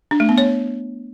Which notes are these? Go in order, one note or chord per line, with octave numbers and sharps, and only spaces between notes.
D4
A3
B3
C#5